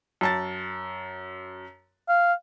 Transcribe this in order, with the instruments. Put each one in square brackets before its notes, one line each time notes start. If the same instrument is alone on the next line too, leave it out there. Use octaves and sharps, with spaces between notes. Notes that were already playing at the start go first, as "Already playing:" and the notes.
[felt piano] F#2 A5 A6
[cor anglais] F5